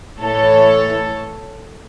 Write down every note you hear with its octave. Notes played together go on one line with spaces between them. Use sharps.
A2 E3 A3 A4 C#5